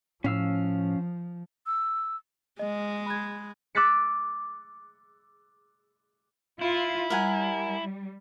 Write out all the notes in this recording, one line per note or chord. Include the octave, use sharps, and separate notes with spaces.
A2 F3 C#4 F5 E6
E6
G#3 D#5
B5 F#6 G#6
D6 E6 F#6 A6 B6 C#7
E4 F4
G3 A#4 F#5 G#5